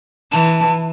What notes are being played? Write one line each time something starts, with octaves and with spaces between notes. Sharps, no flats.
E3 A5